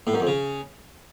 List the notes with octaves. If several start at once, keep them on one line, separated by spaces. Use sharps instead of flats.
A2
F#2
F2
C#3